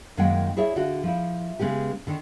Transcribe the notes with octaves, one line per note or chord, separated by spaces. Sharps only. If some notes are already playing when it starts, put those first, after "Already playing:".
F#2 D#3 G#3 A#3 F#5 G5
E4 G#4 C#5 D5 E5
D3 F4 F#4
F3 E4
C#3 G#3 B3 G4
D3 D#3